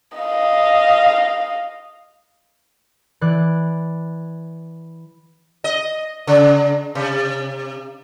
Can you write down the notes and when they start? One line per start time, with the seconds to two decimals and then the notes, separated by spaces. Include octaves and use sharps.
0.18 D#5 F5
3.21 E3 D5 F#6
5.64 D#5
6.27 C#3
6.95 C3